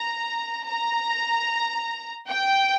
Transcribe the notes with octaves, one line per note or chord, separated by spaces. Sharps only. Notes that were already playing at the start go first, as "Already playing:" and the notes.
Already playing: A#5
A#5
G5